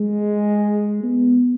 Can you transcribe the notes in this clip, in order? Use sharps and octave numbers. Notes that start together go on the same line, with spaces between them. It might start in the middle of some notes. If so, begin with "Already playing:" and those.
Already playing: G#3
B3